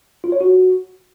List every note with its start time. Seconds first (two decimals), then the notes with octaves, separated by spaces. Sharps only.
0.24 F4
0.32 C#5
0.41 F#4